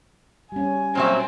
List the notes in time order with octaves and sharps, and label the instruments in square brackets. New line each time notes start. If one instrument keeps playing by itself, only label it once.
[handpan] G3 C#4 [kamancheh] G#5
[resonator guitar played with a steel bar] A#2 F#3 E5 [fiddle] C4